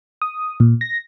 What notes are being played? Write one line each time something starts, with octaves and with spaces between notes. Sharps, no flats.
D#6
A#2
A#6